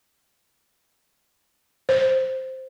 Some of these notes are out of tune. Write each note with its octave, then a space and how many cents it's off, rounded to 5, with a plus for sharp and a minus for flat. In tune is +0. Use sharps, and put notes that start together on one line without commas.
C5 +0